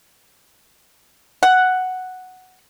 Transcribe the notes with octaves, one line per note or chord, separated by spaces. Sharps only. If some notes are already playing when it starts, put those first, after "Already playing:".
F#5